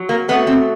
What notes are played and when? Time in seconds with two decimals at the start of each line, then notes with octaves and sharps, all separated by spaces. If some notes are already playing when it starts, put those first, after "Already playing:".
Already playing: F#3
0.09 A#3
0.28 B2 F#3 A3 B3
0.47 C4